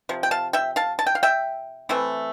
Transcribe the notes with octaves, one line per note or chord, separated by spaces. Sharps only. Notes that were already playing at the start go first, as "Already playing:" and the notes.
C3 F3
G5
F5 A5
E5 G5
F5 A5
A5
G5
F5
E5 G5
E3 A3 C4 E4